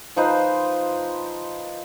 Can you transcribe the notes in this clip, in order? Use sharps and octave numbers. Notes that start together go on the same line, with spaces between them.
F3 D#4 B4 C5